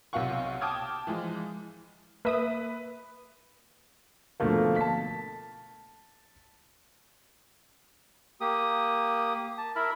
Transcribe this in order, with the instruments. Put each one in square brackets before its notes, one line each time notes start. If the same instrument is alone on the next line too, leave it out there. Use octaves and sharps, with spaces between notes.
[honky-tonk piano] B1 C3 F4 F5 F#5 C#6
G5 A5 D6 D#6 F6 G#6
E3 F3 G#3
[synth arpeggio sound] A#3 E5 D#6 [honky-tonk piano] B4
[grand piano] B2 D3 F3 A3 A#3
A5 B6
[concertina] A#3 G4 D#6
A5
E4 A#4 B5